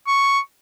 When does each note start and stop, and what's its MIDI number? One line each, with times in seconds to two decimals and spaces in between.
0.07 0.39 85